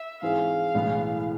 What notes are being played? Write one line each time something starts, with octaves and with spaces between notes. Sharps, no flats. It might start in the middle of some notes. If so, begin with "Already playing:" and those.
Already playing: E5
G#2 E3 G#3 C4 G#4 F5
B1 A2 E3 G#3 B3